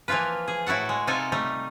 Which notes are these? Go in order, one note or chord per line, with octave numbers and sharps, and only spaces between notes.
E3 F3 A#3 F4 B4
G#4
A2 E4 F#4 A4 F#5
G#3
C3 D#4 F4 A4 D#5 G#5
G3 A3 D#4